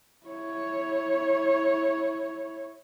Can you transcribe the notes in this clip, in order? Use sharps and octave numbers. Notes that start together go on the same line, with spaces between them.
E4 C#5